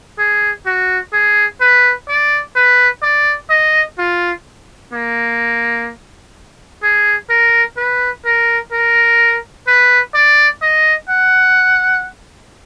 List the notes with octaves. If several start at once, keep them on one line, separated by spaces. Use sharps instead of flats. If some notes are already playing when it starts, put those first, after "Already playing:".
G#4
F#4
G#4
B4
D5
B4
D5
D#5
F4
A#3
G#4
A#4
B4
A#4
A#4
B4
D5
D#5
F#5